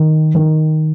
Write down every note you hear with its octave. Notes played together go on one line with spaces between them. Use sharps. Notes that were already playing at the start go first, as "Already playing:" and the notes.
Already playing: D#3
D#3